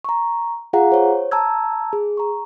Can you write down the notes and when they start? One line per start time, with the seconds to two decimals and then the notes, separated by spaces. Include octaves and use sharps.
0.05 A#5 C#6
0.73 F4 G#4 F5 F#5 A#5
0.92 C5 C#5
1.31 A5 A#5 E6 G#6
1.93 G#4
2.17 A#5 C#6